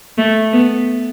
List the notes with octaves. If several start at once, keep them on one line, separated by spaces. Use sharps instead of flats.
A3
B3